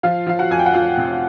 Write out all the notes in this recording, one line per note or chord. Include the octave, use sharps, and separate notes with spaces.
F3 F4 F5
F3 F5
F#4 F#5
F2 G#5
G5
F#5
F2 F4 F5
C3